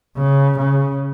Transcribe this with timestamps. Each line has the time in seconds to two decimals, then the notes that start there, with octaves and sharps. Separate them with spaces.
0.16 C#3
0.57 C#3